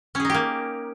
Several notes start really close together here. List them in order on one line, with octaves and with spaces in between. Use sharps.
C#4 G#4 D#4 G4 A#3